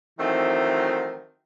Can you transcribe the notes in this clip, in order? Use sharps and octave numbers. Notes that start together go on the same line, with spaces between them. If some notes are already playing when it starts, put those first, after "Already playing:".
D#3 E3 F#3 A3 C4 D#4